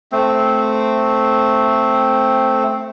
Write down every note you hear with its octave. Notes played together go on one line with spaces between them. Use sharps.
A3 C4